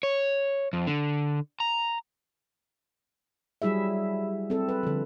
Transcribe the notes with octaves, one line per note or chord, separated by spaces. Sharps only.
C#5
F2
D3
A#5
F#3 G3 E4 G#4 E5
C4 A4
B4
D3 F3